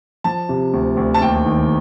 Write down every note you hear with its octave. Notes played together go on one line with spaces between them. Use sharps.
F3 A5
C3
D2
D2
A5
D#2 G5
D#3